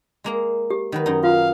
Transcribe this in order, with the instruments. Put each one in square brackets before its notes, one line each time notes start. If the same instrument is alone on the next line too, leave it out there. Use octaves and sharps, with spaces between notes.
[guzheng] G#3 A#3 A#5
[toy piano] G4
[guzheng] D#3 F#3 B4
F#2 D#4
[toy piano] F4 [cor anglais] F5